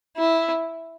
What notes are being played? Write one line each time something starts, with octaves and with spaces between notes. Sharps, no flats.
E4